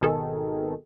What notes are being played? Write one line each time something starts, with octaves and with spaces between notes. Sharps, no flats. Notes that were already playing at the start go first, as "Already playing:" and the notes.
G#1 B2 D#3 G#4 A4